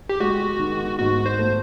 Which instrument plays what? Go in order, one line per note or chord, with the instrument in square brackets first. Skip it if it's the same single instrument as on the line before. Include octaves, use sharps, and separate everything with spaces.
[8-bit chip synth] G4
[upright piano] G#3 [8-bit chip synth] F#4
[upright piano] D#3
[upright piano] G#2 [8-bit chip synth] F#4
[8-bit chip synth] C5
[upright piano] A3